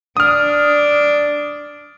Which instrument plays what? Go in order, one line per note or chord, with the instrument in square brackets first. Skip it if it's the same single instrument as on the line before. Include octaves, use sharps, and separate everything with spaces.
[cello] D4 [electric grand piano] D#6 F6